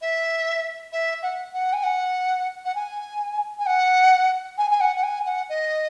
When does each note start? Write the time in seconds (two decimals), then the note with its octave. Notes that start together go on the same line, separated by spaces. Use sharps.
0.01 E5
0.92 E5
1.22 F#5
1.52 F#5
1.73 G#5
1.83 F#5
2.65 F#5
2.75 G#5
3.59 G#5
3.66 F#5
4.57 G#5
4.70 G#5
4.80 F#5
4.95 F#5
5.03 G#5
5.25 F#5
5.49 D#5